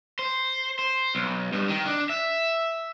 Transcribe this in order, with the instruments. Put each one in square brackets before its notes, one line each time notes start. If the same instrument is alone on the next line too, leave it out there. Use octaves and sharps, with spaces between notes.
[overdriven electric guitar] C5
C5
B1
G2
D#3
D4
E5